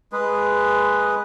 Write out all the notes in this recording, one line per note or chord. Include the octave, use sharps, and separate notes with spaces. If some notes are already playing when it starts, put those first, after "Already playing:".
G#3 G#4 B4